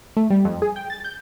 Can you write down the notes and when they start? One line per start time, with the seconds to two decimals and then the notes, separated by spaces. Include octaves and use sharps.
0.17 A3
0.30 G3
0.45 F2
0.62 G#4
0.76 G5
0.90 A6
1.04 G6